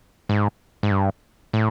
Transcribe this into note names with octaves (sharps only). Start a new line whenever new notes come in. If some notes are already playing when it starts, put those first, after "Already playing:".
G#2
G#2
G2
A2